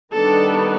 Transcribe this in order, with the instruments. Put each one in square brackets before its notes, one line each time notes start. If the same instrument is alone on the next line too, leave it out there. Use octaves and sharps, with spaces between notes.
[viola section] D#3 G3 B3 D4 A4